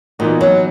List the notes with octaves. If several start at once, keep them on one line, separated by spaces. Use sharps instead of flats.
A#2 E3 B3 D#4 F#4
F#3